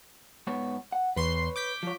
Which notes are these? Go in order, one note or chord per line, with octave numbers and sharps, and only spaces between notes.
G#2 B3 C#5
F#5
E2 B4 C#5 C6 C7
D6 G6 B6
F3 C#5